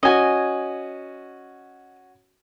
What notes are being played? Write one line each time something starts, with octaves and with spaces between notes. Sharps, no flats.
C#4 F#4 D#5 G#5